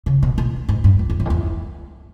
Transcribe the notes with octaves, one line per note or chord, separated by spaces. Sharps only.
C#3
B2
B2
G#2
G2
F2
F2
E2
F2
E2